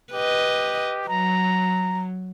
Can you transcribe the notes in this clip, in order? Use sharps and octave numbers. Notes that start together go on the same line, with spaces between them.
G4 B4 D#5
F#3 A#5